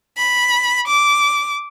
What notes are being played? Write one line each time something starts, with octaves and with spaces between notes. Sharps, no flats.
B5
D6